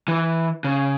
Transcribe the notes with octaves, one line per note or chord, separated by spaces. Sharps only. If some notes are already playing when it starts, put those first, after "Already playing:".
E3
C#3